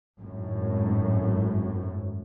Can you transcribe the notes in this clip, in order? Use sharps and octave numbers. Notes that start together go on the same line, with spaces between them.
G#1 F#2 A2